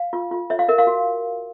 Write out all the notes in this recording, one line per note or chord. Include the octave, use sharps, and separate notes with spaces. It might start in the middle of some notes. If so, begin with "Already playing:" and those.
Already playing: F5
F4
F4
C#5 E5
F5
A#4 E5
F5
F#4